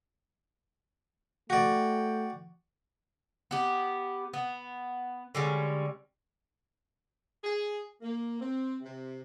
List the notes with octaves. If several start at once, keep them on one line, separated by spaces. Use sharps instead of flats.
A3 F#4 D5 G5
B3 G4
B3
D3 G3 G#3 C#4
G#4
A#3
C4
C3